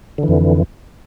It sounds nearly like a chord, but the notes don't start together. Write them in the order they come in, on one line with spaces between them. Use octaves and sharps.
D3 E3 F2